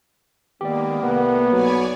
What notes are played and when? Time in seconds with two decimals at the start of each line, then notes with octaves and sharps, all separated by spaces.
0.61 D#3 G#3 A#3 B3 G4 D5
1.02 C2 A3 B3 F#5
1.52 B1 F#3 C#5 D5 G#5